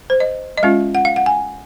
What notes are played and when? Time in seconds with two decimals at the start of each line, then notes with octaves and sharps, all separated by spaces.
0.10 C5
0.20 D#5
0.58 D#5
0.63 G#3 C#4 F4 F5
0.95 F#5
1.05 F5
1.16 F#5
1.26 G#5